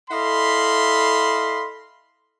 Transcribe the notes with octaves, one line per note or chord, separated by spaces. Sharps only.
E4 A4 D#5 F5 B5 C6